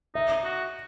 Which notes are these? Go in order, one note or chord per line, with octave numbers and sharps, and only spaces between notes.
D#4 E5
F#4